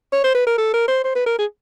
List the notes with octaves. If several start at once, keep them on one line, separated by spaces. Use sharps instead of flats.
C#5
C5
B4
A#4
A4
A#4
C5
C5
B4
A#4
G#4